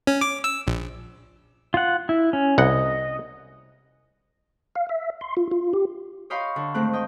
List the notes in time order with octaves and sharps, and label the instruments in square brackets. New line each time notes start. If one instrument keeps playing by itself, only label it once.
[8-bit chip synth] C#4
D6
E6
A#1
[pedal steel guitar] F4 F#5
E4
C#4
[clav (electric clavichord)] C2 F#5 [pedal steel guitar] D#5
[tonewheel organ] F5
E5
C6
F4
F4
G4
[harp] C#5 D#5 F5 G5 B5 C6
D3
G#2 D#3 A3 C4 F#6
D#5 G5